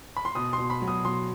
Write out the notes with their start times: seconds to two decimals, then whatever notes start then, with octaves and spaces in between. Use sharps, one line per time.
0.17 B5
0.25 C6
0.35 B2 D#6
0.53 C6
0.58 B2
0.70 B5
0.82 F#3
0.88 D#6
1.04 B2 C6